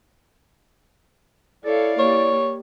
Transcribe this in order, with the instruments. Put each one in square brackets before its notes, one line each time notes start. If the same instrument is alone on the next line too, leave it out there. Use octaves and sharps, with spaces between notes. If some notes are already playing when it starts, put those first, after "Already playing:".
[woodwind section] E4 D5 [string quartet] A4 C#5 F5
[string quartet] G3 A#3 [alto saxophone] C#5